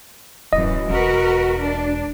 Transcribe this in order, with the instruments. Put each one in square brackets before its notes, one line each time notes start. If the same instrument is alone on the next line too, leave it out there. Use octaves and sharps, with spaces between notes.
[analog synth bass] D1 [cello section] F#2 E3 F#3 [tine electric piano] D#5
[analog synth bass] E1 [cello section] F#4 A#4 B4
[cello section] D4